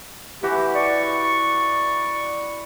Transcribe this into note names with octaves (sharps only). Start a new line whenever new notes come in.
E3 F#4 G4
D5 C#6